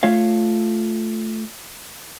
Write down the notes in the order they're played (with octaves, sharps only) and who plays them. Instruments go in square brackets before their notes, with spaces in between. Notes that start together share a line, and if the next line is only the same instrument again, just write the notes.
[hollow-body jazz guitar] A3 F4 C#5 F5